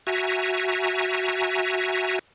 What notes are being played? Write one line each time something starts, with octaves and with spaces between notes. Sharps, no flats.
F#4 E5 G#5 A#5